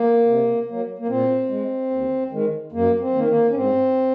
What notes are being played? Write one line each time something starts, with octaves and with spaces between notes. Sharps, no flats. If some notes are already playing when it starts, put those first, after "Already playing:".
Already playing: A#3
C3
F#3 A#3
A#3
A#2 C4
G#3
D#2
D#3 G#3
F#2 A#3
C4
D#3 A#3
A#3
C#4
G#2 C4